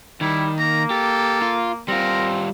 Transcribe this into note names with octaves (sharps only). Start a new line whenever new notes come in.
D#3 G3 E4
A#3 A#5
G4 A4
F4
G3 C4 F4 A#4